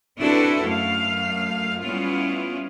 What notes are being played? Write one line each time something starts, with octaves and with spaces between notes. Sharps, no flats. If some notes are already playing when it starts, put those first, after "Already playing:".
C4 D4 E4 F#4 A4 B4
F#2 A3 F5
G3 B3 C#4 E4 F4